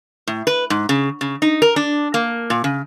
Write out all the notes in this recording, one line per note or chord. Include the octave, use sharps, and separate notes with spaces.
A2
B4
G#2
C#3
C#3
D#4
A#4
D4
A#3
A#2
C#3